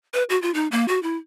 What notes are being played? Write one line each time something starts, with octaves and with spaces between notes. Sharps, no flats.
B4
F#4
F4
D#4
A#3
F#4
E4